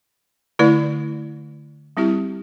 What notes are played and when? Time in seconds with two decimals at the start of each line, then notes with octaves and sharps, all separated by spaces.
0.59 D3 A3 E4 B4 D5
1.97 G3 C4 E4 G4